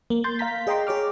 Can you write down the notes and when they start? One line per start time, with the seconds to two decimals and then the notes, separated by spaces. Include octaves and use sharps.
0.10 A#3
0.24 C6 G6 A6
0.39 F5 A#5 B6
0.67 G#4 D#5 G5 A#5 C6 D6
0.87 G#4 C#5 D6 F6